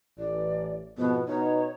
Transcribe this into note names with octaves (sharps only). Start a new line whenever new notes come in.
A1 D5
F2 G#2 B2 B3
B2 B3 D#4 C#5